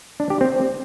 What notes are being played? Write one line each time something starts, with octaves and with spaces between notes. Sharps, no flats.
D4
G4
C4